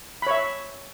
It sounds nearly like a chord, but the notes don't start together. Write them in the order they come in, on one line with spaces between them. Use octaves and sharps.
B5 C#5 E5